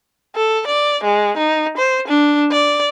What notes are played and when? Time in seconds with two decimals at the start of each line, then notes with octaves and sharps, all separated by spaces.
0.36 A4
0.67 D5
1.04 G#3
1.37 D#4
1.78 C5
2.08 D4
2.52 D5